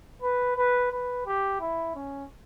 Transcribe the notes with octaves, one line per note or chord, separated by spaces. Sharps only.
B4
B4
B4
G4
E4
C#4